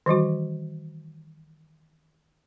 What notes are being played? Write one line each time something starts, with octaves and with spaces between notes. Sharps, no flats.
D#3 E3 G3 F#4